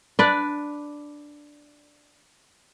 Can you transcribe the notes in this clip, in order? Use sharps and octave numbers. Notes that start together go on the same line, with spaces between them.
D4 B4 D5